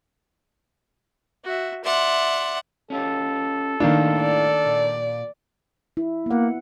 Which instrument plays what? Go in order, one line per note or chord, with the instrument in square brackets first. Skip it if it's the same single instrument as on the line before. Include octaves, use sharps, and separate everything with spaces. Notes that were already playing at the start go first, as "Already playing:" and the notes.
[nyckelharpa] F#4 E5
[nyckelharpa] D5 C6 [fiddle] E5 F#5
[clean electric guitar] C#4 F4 G4 [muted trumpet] A4
[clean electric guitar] A2 E4 F5 [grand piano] D#3 A#3 D4
[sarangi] D5
[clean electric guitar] A#2
[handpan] E4
[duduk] A#3 [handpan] B3 F#5